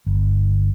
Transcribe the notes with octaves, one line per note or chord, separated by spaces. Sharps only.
G1